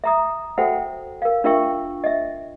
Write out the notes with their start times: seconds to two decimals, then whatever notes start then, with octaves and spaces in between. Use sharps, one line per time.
0.04 E5 A#5 D#6
0.58 F#4 A4 C5 E5 F#5 G5
1.22 A#4 F5
1.44 D4 F4 A#4 E5 G5 C#6
2.04 D#5 E5